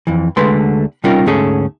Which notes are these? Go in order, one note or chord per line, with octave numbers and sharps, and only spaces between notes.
F2 E3
D2 D3 G#3 A3 B4 C6
C3 G3 C#4 D#4 F4 A#4
D2 G#2 A3 C#4 G#4 A4